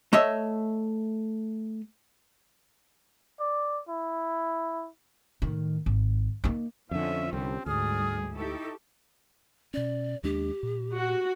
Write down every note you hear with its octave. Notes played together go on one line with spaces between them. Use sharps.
A3 C#5 D#5 E5
D5
E4
A2 D#3
G#1
A#3 D#4
F2 D3 F3 C#4 E5
C2 D3 C4 G4
D2 G#2 G3 G#4 D5 D#6 F6
D#4 E4 G4 A4 C#6
B2 C#4 D5
D#2 G#3 D4 G4
A#2
F#4